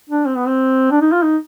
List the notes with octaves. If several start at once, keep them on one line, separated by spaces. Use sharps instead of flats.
D4
C4
B3
C4
D4
D#4
F4
D#4